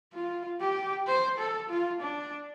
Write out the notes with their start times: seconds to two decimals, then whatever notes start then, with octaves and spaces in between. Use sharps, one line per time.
0.13 F4
0.60 G4
1.07 C5
1.38 A4
1.70 F4
2.01 D4